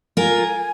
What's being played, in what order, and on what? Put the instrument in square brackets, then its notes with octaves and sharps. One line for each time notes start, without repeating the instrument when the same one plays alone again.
[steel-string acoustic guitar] F4 A#4 [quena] G#5